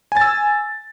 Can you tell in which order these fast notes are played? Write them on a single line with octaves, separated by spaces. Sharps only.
G#5 A6 E6